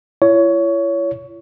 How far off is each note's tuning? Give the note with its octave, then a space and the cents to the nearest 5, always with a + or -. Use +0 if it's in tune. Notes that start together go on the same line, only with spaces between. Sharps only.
E4 +45 C#5 +20